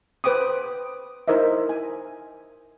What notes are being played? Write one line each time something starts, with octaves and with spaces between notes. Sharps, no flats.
B4 C5 G5 D6 D#6
D#4 E4 A#4 C5 D#5 E5
G#5